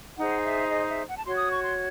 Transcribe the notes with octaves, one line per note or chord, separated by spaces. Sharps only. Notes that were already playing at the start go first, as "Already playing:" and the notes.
D#4 G#4 C5 F#5
E5
D#5
E5
F#5
A5
F#4 C#5 C6
D#6
C#6
C6